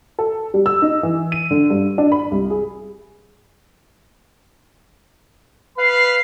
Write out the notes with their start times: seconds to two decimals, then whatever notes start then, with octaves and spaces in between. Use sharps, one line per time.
0.19 A4
0.54 G3
0.66 E6
0.82 D#4
1.03 E3
1.32 D#7
1.51 D3
1.70 G2
1.98 D4
2.12 B5
2.31 C2
2.50 G#4
5.78 B4 F5 B5 C7